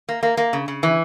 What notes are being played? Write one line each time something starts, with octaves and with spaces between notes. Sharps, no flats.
A#3
A#3
A#3
C#3
C#3
E3